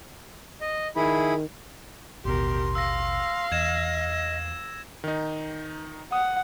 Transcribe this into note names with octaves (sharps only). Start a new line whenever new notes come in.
D#5
D#3 E4 G#4 B5
A1 D#2 B2 G4 A#4 C6
F5 E6 A#6
E2 D#5 G#6 E7
D#3 D#4
F#5 D#6